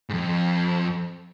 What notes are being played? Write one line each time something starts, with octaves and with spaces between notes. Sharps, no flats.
F2 G#2